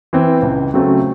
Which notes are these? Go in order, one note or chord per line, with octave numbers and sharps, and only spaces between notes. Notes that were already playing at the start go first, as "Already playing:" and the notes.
E3 C4
C#2
C#3 F#3 A3 C4